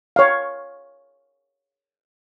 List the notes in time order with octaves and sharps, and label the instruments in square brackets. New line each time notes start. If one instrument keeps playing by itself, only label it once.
[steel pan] C#5 F5